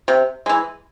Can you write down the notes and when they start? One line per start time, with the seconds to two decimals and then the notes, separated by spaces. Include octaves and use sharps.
0.08 C3
0.46 E3 G#3